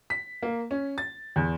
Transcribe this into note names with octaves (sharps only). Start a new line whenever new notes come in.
B6
A#3
C#4
A6
E2